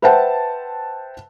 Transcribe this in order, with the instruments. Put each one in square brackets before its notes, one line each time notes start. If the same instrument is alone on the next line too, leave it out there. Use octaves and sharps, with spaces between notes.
[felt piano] B4 C5 E5 F#5 G5 A5